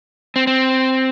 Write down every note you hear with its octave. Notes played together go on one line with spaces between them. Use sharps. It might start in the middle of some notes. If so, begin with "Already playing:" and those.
C4
C4